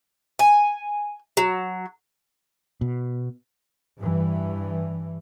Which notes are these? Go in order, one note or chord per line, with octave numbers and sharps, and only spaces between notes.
G#5
F#3
B2
G2 E3